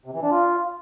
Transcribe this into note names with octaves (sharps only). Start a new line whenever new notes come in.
C3
E3
D4
F4